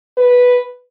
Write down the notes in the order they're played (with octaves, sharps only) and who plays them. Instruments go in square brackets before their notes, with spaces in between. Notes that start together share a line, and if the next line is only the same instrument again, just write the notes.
[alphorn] B4